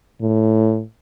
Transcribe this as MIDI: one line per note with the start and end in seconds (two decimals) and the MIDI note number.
0.21 0.82 45